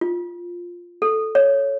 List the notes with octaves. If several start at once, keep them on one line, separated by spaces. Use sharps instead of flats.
F4
A4
C#5